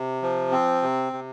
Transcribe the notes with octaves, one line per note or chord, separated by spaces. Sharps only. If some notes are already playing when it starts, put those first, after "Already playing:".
Already playing: C3
F3
C4
C3
C3